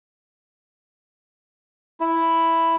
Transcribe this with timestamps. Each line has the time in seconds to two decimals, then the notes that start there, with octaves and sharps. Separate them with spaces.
2.00 E4